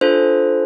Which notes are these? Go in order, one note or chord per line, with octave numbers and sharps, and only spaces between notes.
D4 F4 A4 C5